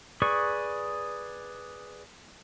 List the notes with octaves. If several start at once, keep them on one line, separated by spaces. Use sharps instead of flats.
G#4 B4 D5 C#6